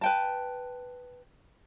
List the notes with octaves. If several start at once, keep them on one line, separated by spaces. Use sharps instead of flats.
B4 G5 A5